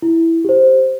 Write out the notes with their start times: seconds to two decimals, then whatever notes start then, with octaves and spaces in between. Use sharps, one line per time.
0.02 E4
0.45 G4 C5